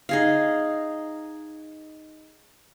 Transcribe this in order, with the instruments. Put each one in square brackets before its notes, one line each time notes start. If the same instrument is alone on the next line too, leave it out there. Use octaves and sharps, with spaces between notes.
[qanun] D#4 G#4 F5